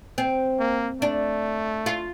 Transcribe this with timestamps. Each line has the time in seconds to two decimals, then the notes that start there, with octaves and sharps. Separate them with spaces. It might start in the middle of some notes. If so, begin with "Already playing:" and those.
0.18 C4
0.59 A#3
1.01 A3 D4
1.86 F4